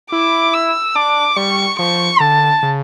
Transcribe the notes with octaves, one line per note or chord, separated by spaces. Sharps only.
E4 D6
E6
D4 D6
G3 C#6
F3 C#6
D3 A5
C#3